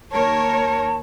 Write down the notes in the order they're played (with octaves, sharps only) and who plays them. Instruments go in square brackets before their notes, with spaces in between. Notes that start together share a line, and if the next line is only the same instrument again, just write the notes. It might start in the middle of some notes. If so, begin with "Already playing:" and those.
[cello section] D#2 A#4 C#5 [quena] A5